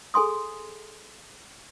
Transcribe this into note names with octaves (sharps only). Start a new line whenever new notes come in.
G#4 A4 G#5 C6 D#6